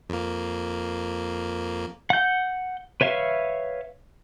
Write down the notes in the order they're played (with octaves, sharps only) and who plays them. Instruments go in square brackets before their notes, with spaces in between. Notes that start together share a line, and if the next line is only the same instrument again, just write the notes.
[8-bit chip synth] F2 A#3
[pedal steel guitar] F#5 G6
B4 C#5 E5 F5